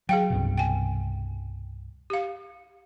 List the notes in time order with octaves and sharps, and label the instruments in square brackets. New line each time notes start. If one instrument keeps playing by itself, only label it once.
[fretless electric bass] F#3 [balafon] G#4 F5 G5
[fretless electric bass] C2 G2 B2
[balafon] G5 G#5
G4 F5